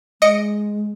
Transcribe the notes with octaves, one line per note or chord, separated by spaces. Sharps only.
G#3 D#5 C#7 D7